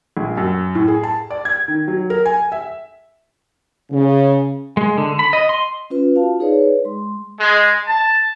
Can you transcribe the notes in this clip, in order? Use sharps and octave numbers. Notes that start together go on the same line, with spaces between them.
A#1
F#2
A2
G#4
A5
D5
G#6
D#3
F#3
A#4
G#5
E5
C#3
G#3
D3
B5
D#5
C6
C#4 F4 B4
F4 F#4 F5 A5
D#4 G#4 B4 C#5 D5
G#3 C6
G#3
A5